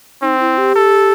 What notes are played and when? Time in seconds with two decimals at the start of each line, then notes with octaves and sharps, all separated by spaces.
0.22 C4 D#4
0.40 E4
0.58 G4
0.75 A4